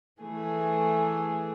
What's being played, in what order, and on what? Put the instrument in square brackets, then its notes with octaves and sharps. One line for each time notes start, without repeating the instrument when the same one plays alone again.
[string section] E3 A3 G#4